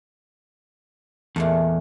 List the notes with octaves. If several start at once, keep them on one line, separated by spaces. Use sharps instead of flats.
E2 A#2 G#3 A3